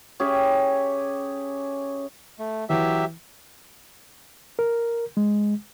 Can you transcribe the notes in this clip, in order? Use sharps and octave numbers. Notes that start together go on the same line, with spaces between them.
C#4 G4 G#4 E5
A3
E3 F#3 G4 E5
A#4
G#3